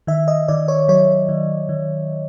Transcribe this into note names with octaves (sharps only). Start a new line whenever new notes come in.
D#3 E5
D#5
D#3 D5
C#5
F#3 C#5
D#3
D#3